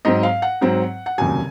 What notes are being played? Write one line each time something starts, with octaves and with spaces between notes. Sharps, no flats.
G#2 F#3 C4 D#5
F5
F#5
G#2 F#3 C4
F#5
F1 D#2 C#3 F#3 G#5